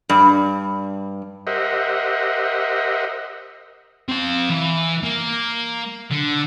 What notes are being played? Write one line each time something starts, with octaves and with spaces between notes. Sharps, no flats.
G2
G4 A#4 C5 D#5 E5 F#5
C4 F5
E3
A#3
D3